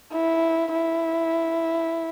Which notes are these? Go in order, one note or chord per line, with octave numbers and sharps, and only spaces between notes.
E4
E4